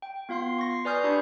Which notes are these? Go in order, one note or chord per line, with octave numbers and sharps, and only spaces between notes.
G5
B3 F4 F5 C6 C7
C#6 A#6
C7
B4 D5 G#5 D#6 F6 G6
D4 G4 B5 C#6